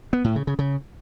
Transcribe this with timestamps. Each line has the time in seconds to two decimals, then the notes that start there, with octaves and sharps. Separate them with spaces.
0.13 B3
0.24 A2
0.36 C#3
0.47 C#3
0.59 C#3